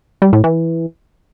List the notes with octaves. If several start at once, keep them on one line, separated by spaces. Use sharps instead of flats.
G3
A2
E3